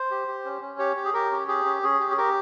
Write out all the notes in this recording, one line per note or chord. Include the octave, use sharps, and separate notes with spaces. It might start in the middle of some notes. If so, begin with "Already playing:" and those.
Already playing: C5
G4
G4
C#4
C#4
G4 C#5
G4
G#4
G4 A#4
C#4
G4 G#4
C#4
C#4 G#4
G4
G#4
G4 A#4